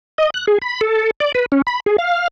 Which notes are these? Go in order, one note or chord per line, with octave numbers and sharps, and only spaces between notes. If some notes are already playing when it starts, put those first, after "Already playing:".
D#5
F#6
G#4
B5
A4
D5
B4
C#4
B5
G#4
F5